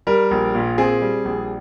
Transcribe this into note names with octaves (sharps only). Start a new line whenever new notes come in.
G3 A#4
A#1
A#2
C4 G#4
G3
A#1